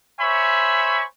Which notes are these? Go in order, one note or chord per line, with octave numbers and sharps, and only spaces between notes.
C5 C#5 E5 G#5 B5 C#6